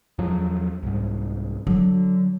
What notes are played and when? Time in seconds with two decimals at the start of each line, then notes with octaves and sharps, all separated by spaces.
0.18 E2 F3 F#3
0.83 C2 G#2
1.67 D3 F#3